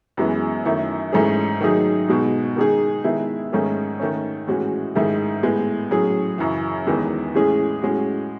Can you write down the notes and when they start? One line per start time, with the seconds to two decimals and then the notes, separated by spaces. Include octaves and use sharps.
0.17 F#2 E3 G#3 B3
0.65 F#2 D#3 A3 E4
1.12 G#2 E3 A3 C#4 G#4
1.61 D#3 F#3 A3 D#4 G#4
2.08 B2 G#3 D#4 F#4
2.56 D#3 G#3 D#4 G#4
3.04 D#3 G#3 B3 E4
3.52 G#2 D#3 A3 C#4 G#4
3.99 D#3 A3 C#4
4.47 A2 E3 G#3 C#4 F#4
4.95 G#2 D#3 A3 E4 G#4
5.43 A2 G#3 B3
5.91 A2 F#3 C#4 G#4
6.38 F#2 C#3 E3
6.87 E2 D#3 G#3 B3
7.34 A2 E3 G#3 C#4 G#4
7.82 A2 G#3 C#4 F#4